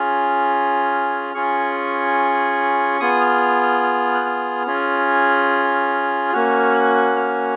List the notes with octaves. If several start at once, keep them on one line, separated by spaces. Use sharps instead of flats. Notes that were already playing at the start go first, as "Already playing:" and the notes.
Already playing: C#4 F4 G#4 F6
C#4 F4 G#4 C#6
B3 F4 G#4 D#6
F6
F6
F6
F6
F#6
F6
C#4 F4 G#4
A#3 C#4 F#4 F6
F#6
F6